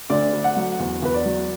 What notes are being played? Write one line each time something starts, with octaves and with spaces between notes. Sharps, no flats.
D2 D5
D2
F#5
F#3
E2
E2 B4
D5
F#3